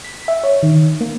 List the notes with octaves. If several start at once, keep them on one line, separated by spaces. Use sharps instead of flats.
B6
E5
C#5
D#3
A#3